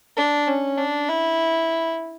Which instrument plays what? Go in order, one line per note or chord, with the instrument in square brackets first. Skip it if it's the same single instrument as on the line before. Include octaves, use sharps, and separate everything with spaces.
[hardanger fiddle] D4
C#4
D4
E4